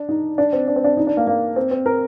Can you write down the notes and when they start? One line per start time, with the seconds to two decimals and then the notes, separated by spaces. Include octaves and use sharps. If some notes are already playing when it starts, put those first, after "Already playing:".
Already playing: D4
0.09 D#4
0.38 D4
0.53 C4
0.68 D4
0.76 C4
0.84 D4
0.97 D#4
1.07 D4
1.17 A#3
1.27 A#3
1.56 C4
1.71 C4
1.86 A#4